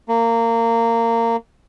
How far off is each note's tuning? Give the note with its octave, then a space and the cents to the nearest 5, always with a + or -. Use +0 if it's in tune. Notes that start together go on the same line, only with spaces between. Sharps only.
A#3 -20